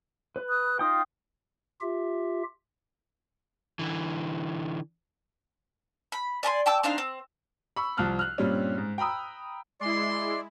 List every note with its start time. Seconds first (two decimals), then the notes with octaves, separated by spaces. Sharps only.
0.36 B4
0.49 D#6 F#6
0.79 D#4 F4 G5 D#6
1.81 F4 G4 E5
3.79 D3 E3
6.12 B5
6.43 D5 G#5 A#5 C6
6.66 G5 A5 D6 E6
6.83 C4 D4 D#4 F5
6.98 C4
7.76 B5 C#6 E6
7.97 C2 F3 A5 F6 F#6
8.19 F6 F#6
8.38 G2 A#2 G3 C4 C#4
8.78 G#2
8.98 G5 A#5 B5 D#6 E6
9.80 G#3 E4 D5 C6